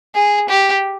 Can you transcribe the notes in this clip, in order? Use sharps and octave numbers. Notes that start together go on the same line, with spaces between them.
G#4
G4